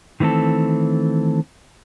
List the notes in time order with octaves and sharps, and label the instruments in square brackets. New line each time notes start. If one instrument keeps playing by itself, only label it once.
[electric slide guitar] D#3 E3 A3 C4 A4